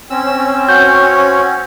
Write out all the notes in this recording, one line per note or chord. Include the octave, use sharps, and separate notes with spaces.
C4 C#4 E6
F#4 C#5 G6